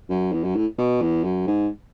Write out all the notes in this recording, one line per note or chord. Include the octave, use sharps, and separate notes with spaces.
F#2
E2
F#2
A2
B2
E2
F#2
G#2